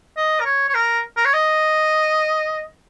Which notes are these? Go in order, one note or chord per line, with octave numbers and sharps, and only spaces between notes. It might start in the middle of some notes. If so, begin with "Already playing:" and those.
D#5
A#4
C#5
C#5
A#4
A#4
C#5
D#5